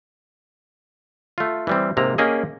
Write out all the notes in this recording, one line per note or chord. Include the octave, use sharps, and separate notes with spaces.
A3 F4
E3 G3 C4
G#2 C3 A#3 A#5
A#3 C#4 G4 G#4 D#5